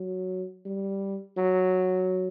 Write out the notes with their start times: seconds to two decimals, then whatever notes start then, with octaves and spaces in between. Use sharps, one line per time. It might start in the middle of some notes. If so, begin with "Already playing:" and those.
Already playing: F#3
0.66 G3
1.37 F#3